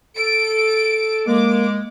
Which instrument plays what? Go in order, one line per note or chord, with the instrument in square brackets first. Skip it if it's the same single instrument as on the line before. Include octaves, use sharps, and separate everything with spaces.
[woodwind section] A4 [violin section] D7
[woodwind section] G#3 [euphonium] A#3 [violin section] D6